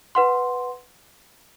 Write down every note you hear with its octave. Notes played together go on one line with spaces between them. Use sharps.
B4 F#5 C6